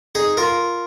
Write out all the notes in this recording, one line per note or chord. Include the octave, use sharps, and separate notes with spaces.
D#4 G#4
F4 A#4